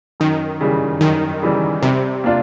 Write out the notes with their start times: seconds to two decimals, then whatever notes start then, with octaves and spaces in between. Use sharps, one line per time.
0.20 F#2 D#3
0.61 C#3 E3 G3
1.01 F#2 D#3
1.42 C#3 E3 G3
1.83 C3 G3
2.24 A#3 D4 F4